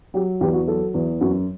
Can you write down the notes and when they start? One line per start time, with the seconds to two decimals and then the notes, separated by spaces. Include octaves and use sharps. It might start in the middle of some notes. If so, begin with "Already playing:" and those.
0.14 F#3 G4
0.41 E2 G4
0.54 F#4
0.67 F#3 A4
0.94 E2
1.21 F#2 F#4